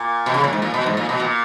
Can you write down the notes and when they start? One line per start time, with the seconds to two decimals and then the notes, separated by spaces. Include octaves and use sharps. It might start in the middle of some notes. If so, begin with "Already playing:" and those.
Already playing: A#2
0.26 B2
0.34 C#3
0.44 A#2
0.53 G#2
0.62 A#2
0.74 B2
0.86 G#2
0.97 A#2
1.09 B2
1.20 A#2